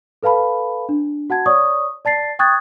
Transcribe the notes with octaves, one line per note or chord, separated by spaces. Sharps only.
A4 B4 F5 A5 B5
D4
F#4 F#5 A5 G#6
C#5 D5 C#6 D#6
D5 A5 A6 C7
G5 C#6 D#6 F#6 G#6 A6